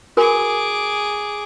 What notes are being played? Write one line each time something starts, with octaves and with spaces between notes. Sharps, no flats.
F#4 G#4 A#4 G#5 D6